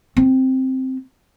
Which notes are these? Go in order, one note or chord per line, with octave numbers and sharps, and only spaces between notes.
C4